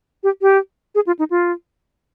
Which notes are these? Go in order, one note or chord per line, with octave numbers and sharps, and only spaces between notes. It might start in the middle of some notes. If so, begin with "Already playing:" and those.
G4
G4
G#4
F4
D#4
F4